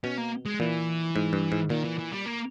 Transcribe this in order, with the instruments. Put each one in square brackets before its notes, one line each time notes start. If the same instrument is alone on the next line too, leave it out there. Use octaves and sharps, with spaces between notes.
[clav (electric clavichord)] B2 [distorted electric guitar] C#4
[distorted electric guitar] A#3
G#3
[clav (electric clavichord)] A#2 [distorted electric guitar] E3
[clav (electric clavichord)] G#2
G2
G#2
[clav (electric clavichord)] A#2 [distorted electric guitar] D#3
[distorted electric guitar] E3
E3
G3
A#3